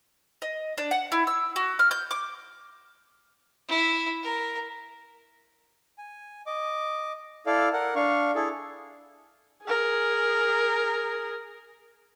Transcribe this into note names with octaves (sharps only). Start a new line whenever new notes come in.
D#5
D4
F#5
E4
E6
F#4
F6
G6
D6
E4
A#4
G#5
D#5 D6
E4 A4 D5 F5
A#4 F#5
D4 F5 C#6
E4 G#4 A4
G#4 A#4